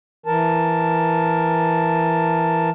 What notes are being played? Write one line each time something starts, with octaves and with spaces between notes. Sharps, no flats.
E3 A#4 A5